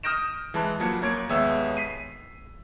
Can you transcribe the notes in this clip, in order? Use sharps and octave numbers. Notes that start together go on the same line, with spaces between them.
D#6 F6 G6 A#6 D7 E7
E3 G#3 A5 B5 F#6
F3 F#3 A#3 A5 G#6 C#7
F#2 A#3 C#5 G#6 D7
D#2 G#3 B3 C#5 E5 E6
B6 C7 D#7